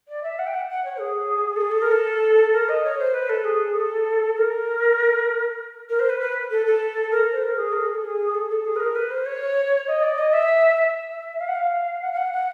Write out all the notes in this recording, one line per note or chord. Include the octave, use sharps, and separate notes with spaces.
D5
E5
F#5
G5
F#5
F#5
C#5
G#4
A4
G#4
A4
A#4
A4
A#4
D#5
C#5
C5
B4
A4
G#4
A4
A#4
A#4
C5
B4
B4
A4
A4
A#4
C5
A#4
G#4
A#4
A4
G#4
A4
G#4
A4
A4
G#4
B4
A#4
B4
C5
C#5
D#5
D5
D#5
E5
E5
F5
F#5
F5
F#5
F5
F#5
F#5